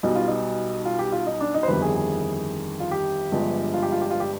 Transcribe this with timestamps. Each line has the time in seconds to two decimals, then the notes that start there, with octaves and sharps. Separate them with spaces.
0.03 B1 B2 G3 D#4
0.15 F4
0.27 D#4
0.86 F4
0.99 G4
1.12 F4
1.26 D#4
1.40 D4
1.54 D#4
1.63 C5
1.68 G1 F2 D#3 G3 B4
1.82 G#4
1.95 G#4
2.80 F4
2.91 G4
3.32 G1 G2 F3 G#3
3.74 F4
3.83 G4
3.92 F4
4.01 G4
4.11 F4
4.20 G4